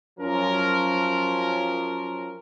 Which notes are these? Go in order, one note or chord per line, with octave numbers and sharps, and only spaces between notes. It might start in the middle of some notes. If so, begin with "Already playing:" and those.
F#2 F3 C#4 A#4